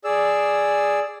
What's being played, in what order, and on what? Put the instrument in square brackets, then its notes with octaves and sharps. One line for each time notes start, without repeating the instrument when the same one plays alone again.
[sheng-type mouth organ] G#4 D5 E6